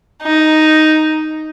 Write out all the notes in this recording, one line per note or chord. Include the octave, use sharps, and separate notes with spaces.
D#4